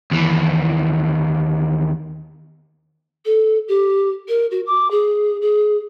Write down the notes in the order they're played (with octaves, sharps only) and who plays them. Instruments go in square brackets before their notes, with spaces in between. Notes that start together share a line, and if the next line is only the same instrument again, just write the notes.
[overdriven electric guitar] D#2 E3
[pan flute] A4
G4
A#4
F#4
D6
G#4
G#4